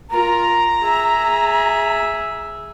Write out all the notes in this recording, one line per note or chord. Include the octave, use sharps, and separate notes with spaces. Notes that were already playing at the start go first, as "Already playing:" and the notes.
F4 A#4 A#5
G#4 E5